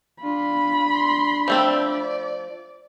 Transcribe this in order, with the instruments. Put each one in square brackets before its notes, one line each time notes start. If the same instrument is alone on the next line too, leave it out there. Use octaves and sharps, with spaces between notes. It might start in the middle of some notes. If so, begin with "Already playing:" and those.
[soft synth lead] D4 [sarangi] F4 [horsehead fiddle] B5
[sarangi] C6
[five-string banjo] F3 A3 C4 [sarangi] D5